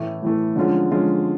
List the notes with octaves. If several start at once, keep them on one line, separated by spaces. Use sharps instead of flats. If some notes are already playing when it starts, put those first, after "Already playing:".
Already playing: A2 E3 A3
A2 E3 A3
D3 F3 G#3 C#4 F4
D3 F3 G#3 C#4 F4